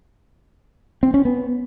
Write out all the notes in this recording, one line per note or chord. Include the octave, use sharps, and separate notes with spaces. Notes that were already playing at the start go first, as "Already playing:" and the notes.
C4
C#4
B3